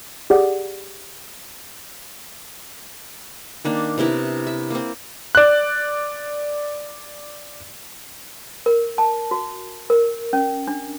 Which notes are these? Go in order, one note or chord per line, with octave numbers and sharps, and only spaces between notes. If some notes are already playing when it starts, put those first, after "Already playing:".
G4 G#4 D5 F#5
D#3 A#3 D4
C3 B3 E4 A#4
E5
A#3 C4
D5 F#6
A#4
A5
F#4
A#4
C#4
D4